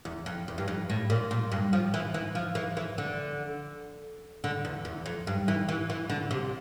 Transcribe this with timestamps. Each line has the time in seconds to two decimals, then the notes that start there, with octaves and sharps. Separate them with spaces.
0.05 E2
0.26 F2
0.48 E2
0.58 G2
0.68 F2
0.90 A2
1.10 A#2
1.31 A#2
1.52 G2
1.73 F3
1.94 E3
2.14 E3
2.35 F3
2.55 E3
2.77 E3
2.98 D3
4.44 D3
4.65 E2
4.85 E2
5.06 F2
5.27 G2
5.48 E3
5.69 E3
5.90 E3
6.10 D3
6.31 C3